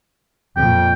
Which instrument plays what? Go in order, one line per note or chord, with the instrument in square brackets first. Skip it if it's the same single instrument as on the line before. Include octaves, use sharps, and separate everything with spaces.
[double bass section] F2 A#2 [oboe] G5